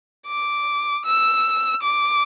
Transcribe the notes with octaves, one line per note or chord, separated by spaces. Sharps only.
D6
E6
D6